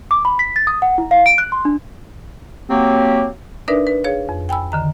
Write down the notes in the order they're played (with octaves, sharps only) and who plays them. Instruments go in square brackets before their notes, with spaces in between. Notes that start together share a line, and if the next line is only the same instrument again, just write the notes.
[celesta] D6
B5
B6
A6
D#6
F#5
E4
F5
D7
F#6
C6
D4
[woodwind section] F#3 A#3 C4 G4
[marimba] D4 D#4 A#4 B4 D5 E5
B4
G#4 C#5 F5
F2
G5 G#5 B5 E6
D3 D#3 A#5